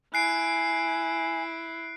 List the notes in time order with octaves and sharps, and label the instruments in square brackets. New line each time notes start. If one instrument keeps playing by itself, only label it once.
[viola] E4 [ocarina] G#5 [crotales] F#6 C7 D7